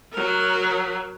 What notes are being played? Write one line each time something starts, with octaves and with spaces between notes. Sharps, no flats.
F#3 A#4